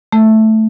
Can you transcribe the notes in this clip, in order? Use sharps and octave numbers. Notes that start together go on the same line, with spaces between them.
A3